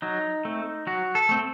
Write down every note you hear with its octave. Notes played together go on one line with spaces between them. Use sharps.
F#3 D#4
A3 C4
F#3 F#4
A4
A3 C4